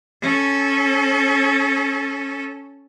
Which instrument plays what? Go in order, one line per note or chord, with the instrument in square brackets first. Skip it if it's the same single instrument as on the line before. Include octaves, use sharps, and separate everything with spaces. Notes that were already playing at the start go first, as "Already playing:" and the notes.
[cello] C#4 A4